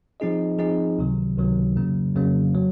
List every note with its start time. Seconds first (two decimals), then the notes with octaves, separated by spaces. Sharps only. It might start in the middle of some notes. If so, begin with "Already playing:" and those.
0.20 F3 C4 D#4 G#4 D#5
0.59 F3 C4 D#4 G#4 D#5
0.98 C#2 C3 D#3 F#3
1.37 C#2 C3 D#3 F#3
1.76 F2 C#3 F#3 A#3
2.15 F2 C#3 F#3 A#3
2.54 F#3